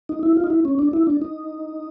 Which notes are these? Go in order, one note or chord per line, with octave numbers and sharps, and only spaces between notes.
D#4
E4
F4
D#4
E4
C#4
D4
E4
D4
D#4